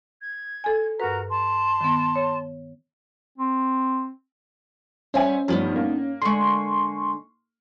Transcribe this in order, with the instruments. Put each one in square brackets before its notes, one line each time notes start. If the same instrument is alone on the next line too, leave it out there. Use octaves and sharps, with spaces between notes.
[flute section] G#6
[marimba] A4 G#5
[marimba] G2 B4 [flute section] F#4 A#4 A#5
[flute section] A5 C6
[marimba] D#3 B3
C#5
[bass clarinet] C4
[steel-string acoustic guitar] G3 F#5 [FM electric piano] C#4 [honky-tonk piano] C5 E5 G#5
[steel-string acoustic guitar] D2 B3 D#4 [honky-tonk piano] G2 F3
[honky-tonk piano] A#3
[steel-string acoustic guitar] D3 G#3 [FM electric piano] C6 C#6